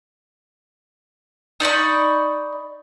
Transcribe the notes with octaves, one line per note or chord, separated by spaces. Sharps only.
D#4 D5 B5 C#6